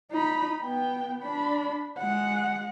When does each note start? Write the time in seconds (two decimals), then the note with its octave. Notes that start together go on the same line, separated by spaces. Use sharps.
0.11 D#4 B5
0.62 B3 G5
1.22 D4 B5
1.98 G#3 F#5